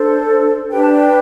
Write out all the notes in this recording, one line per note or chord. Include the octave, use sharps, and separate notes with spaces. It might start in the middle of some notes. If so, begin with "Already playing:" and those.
Already playing: D4 A4 C5
D4 G4 B4 G5
A5
G5